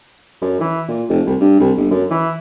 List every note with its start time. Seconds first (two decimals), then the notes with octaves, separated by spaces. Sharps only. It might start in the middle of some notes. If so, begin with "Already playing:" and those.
0.41 F#2
0.61 E3
0.88 A#2
1.09 F1
1.26 C2
1.40 G2
1.60 C2
1.77 G1
1.90 F#2
2.11 E3